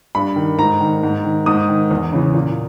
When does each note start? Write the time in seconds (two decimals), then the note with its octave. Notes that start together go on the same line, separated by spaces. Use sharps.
0.15 G2 B5
0.36 D#3
0.58 G#2 A#5
0.80 D#3
1.03 G#2
1.25 D#3
1.46 G#2 D#6
1.69 D#3
1.91 E2
2.12 C#3 E3
2.34 A#2